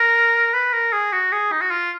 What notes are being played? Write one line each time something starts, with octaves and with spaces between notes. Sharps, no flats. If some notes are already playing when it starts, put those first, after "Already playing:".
Already playing: A#4
B4
A#4
G#4
F#4
G#4
D#4
F#4
F4